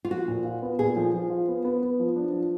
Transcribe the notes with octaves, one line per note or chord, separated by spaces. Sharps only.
F4
F3 F#4
A#2
F4
B3
A#2 G#4
F3
F3
F4
B3
B3
B3
F3
D4
F3